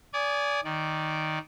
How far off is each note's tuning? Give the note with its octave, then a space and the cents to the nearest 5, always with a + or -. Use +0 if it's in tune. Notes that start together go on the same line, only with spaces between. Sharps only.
D5 -30 G#5 +0 D#6 -35
D#3 +0 D5 -10